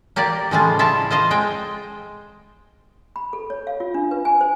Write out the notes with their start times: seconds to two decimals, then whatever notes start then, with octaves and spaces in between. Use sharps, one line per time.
0.16 A#3 G4 A#4 D5
0.51 A2 C#3 F3 G3 G#3 F4
0.79 E4 F4 E5 A5
1.11 F4 C5 D#5 F5
1.31 G#3 G5
3.16 B5
3.33 A4
3.50 C#5
3.67 F5
3.80 F4
3.94 D4
4.11 B4
4.25 G#5
4.41 C5